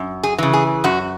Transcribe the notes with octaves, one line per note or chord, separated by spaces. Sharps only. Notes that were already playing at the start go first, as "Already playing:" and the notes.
Already playing: F#2
G#4
C#3 E3
G#4
F#2 F#4